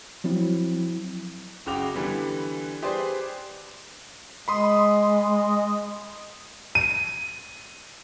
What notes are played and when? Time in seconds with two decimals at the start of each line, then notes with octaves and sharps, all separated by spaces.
0.24 F3 F#3 C4 E4
1.66 F#1 C#3 F#4 G5 D6 F7
1.95 D3 E3 G3 B3
2.82 G4 G#4 B4 C5 D5
4.48 G#3 D#5 B5 C6 D#6
6.75 D#7